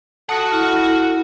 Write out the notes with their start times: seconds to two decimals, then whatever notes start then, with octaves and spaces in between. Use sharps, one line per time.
0.29 F#4 A4 F#5 A5 D#6 C#7
0.52 E4 F6